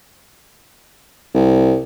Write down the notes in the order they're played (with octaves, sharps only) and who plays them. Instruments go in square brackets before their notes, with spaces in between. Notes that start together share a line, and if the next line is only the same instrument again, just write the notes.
[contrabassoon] C2